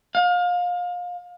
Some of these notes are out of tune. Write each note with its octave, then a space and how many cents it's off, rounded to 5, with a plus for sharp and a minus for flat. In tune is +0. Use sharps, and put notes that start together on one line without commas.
F5 +30